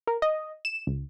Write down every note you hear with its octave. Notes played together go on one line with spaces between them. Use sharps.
A#4
D#5
E7
C#2